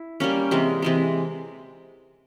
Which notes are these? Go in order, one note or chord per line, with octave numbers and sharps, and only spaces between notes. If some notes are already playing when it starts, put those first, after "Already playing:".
Already playing: E4
G3 A#3 C#4
C3 E3 G#3
C3 E3 G#3